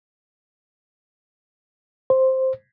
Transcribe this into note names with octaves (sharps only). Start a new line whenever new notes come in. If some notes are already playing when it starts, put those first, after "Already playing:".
C5